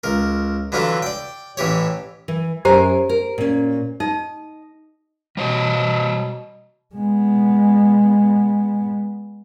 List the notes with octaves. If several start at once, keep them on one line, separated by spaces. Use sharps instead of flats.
C#2 A#4
D3 E3 F#3 E4 F4 A4
D5 G5
A1 E3 G4 C#5
E3
F#2 G4 A#4 C5 G#5 A#5
A#4
A#2 C#4
D#4 D#5
B2 G3 C5 C#5
G#3 B3